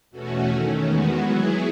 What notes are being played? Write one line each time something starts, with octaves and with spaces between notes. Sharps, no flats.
E2 B2 A3 C#4 F#4
D#3 A3 C#4
E2 D#3 G#3 B3 F#4
F#3 B3 E4 G#4